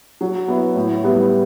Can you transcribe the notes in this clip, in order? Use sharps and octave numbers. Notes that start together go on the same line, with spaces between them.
F#3
B3 E4
A2
G3 B3 E4